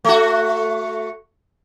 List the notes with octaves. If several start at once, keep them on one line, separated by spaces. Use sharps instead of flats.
A3 F#4